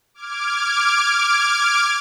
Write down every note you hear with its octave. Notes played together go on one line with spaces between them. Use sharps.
D6 F6 G#6 D7